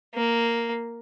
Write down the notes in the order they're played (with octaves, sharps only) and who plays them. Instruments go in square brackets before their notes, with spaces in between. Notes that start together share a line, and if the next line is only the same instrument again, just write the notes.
[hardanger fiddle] A#3